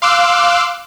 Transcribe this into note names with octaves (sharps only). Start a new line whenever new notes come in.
F5 C6 D6 E6 F#6